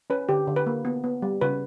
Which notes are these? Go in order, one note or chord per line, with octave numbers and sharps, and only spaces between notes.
C#4 B4
D3 G4
D3
B4
A#3
B3
B3
G3
C#3 B4